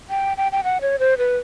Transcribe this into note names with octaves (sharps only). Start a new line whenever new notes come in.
G5
G5
G5
F#5
C#5
C5
B4